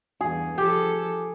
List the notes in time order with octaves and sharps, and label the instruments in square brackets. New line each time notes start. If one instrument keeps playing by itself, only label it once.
[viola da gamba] E2 G2 [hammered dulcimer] G#4
[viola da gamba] F3 A4 [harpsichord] G4